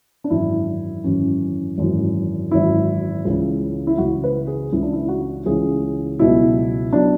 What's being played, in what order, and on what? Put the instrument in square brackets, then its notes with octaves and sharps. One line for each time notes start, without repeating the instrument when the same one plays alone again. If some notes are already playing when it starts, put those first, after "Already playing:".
[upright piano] D4
G#1 F#2 E3 E4
G#1 F#2 E3 C#4
G#1 F#2 E3
G#1 F#2 E3 E4
C#2 C#3 E3
E4
C#2 C#3 E3 F#4
B4
G#4
C#2 C#3 E3 E4
D4
E4
F#4
C#2 C#3 E3 G#4
C#2 B2 F#3 E4
B2 F#3 D4